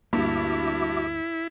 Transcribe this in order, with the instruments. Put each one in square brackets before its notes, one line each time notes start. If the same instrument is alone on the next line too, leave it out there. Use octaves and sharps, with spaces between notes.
[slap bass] D2 A#3 [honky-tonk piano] G2 [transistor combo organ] E4 [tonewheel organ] F#4 E5 D6